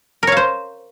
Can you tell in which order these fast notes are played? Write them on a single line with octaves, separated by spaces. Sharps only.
A#4 C#5 F5 C5